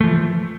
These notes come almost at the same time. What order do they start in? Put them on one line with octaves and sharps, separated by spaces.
A3 F3 E3